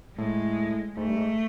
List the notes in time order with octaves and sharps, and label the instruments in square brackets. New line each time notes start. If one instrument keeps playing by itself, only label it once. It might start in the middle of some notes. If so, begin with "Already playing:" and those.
[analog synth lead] A2 [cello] G#3
[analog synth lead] G#2 [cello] A3
[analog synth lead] G2
G#2